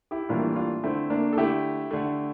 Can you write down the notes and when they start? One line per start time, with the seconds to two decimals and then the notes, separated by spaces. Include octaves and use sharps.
0.11 E4 G4
0.29 A2 E3 G3 A#3 D4 F4
0.56 D4 F4
0.83 D3 A3 C4 E4
1.10 A#3 D4
1.33 A4
1.37 D3 A3 E4 G4
1.91 D3 A3